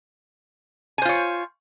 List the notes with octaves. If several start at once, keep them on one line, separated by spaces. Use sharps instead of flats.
F4 C5 C#5 G#5